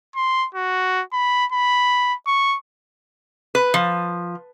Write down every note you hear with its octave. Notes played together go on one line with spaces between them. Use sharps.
C6
F#4
B5
B5
C#6
B4
F3